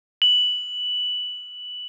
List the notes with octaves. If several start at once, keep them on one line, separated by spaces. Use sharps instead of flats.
F#7